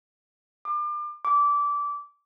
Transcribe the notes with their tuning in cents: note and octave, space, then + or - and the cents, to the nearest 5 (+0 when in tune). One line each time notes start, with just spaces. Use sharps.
D6 +35
D6 -20